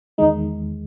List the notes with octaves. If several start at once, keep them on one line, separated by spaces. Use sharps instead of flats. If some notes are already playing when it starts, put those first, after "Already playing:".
E2 D#3 G#3 D#4